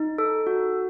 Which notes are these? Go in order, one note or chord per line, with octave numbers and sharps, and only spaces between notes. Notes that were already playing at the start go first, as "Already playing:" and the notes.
Already playing: D#4
A4
F#4